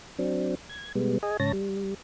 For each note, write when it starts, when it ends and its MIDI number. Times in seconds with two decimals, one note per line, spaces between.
0.19 0.55 54
0.19 0.55 60
0.19 0.55 62
0.69 0.92 92
0.95 1.18 47
0.95 1.18 55
0.95 1.18 56
0.95 1.18 59
1.23 1.37 68
1.23 1.37 75
1.23 1.37 80
1.40 1.52 44
1.40 1.52 49
1.40 1.52 73
1.40 1.52 81
1.40 1.52 94
1.53 1.94 55